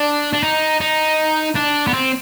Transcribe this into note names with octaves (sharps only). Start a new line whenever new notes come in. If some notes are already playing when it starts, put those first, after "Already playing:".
Already playing: D4
D4
D#4
D#4
D4
B3
C4